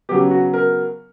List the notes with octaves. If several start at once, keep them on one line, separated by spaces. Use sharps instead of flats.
C#3 F#3 B3 G4
F#4
A#4